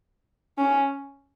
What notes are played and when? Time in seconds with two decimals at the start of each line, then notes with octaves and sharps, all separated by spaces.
0.58 C#4